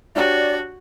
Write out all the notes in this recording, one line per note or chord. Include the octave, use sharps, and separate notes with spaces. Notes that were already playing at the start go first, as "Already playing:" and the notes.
D4 F#4 G4 C#5 D5